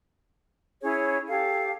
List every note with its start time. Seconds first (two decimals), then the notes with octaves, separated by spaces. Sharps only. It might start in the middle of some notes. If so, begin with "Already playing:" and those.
0.81 C#4 E4 G#4 C#5
1.27 G4 A4 F5